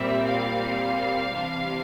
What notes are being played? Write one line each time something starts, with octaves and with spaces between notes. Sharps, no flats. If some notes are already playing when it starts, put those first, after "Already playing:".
Already playing: A#2 G3 C4 E5
F5
C3 E3 G3 D4